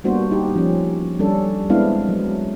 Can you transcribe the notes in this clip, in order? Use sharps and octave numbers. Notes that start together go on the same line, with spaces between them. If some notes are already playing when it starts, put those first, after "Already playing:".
G3 A#3 B3 D4 F#4 C5
D#4 G4
F3 C#4
G3 C#4 D4 A4
G#3 B3 C4 D4 E4 F5
F#3